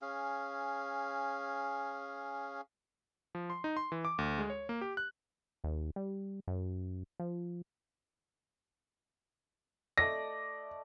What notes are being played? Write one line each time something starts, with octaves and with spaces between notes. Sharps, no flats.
C#4 G#4 F5
F3
C6
D#4
C6
E3
D6
D2
G#3
C#5
A#3
G4
F#6
D#2
G3
F#2
F3
A3 D5 D#5 A#6